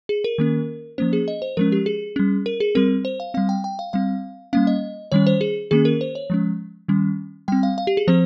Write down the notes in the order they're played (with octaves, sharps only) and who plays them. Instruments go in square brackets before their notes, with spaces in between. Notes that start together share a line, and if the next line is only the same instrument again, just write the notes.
[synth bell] G#4
A#4
D#3 A#3 C#4
F3 A#3 C#4 C5
G#4
D#5
C5
F3 G#3 C#4 A#4
G4
G#4
G3 C#4
A#4
G#4
G3 C4 A#4
C5
F5
G3 C4 F5
G5
G5
F5
G3 C4 F5
G3 A#3 C#4 F5
D#5
D#3 G3 C#4 C#5
C5
G#4
D#3 A#3 C#4 G#4
A#4
C5
C#5
F3 G#3 C#4
D#3 G3 C#4
G3 C4 G5
F5
F5
G4
G#4
F3 C4 C5